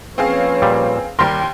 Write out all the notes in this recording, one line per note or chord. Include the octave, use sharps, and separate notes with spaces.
F3 A#3 C4 C#4 G#4 B4 C#5 F5
A#2 G3
D#2 G3 G4 A#4 G5 C6